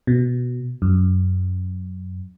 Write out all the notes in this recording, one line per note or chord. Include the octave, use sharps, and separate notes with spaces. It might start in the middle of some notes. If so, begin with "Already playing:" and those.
B2
F#2